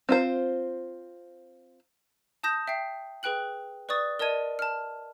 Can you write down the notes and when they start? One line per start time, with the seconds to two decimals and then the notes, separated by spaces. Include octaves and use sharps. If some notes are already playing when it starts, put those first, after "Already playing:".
0.09 C4 F4 C5
2.43 A5 D#6 G6 A#6 E7
2.67 E5 G5 C7
3.23 G#4 B4 G5 F#6 F#7
3.89 B4 D5 C#6 D#6 A6
4.19 A#4 D5 D#5 A5 G#6 D#7
4.59 A5 F6